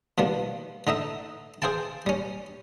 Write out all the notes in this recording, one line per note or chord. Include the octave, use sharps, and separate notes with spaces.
B2 D#3 F3 G3
D3 D#4 D#5 E5
G#4 C5 F5 G5 A5
G3 C#4